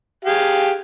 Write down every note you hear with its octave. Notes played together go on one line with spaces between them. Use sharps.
G4 G#4 F5